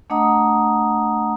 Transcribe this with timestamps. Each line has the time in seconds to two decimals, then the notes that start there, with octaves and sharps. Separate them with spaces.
0.10 A3 D4 D#5 F#5 A#5 D#6